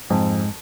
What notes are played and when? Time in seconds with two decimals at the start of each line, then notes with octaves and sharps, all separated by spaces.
0.10 F2 G#2